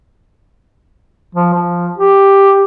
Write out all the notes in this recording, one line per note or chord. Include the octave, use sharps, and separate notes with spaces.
F3
F3
G4